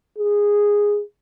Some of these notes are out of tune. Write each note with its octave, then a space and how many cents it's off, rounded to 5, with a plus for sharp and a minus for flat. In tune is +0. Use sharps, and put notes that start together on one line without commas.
G#4 -10